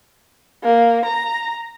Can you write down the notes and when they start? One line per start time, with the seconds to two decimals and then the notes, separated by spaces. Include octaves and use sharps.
0.64 A#3
1.05 A#5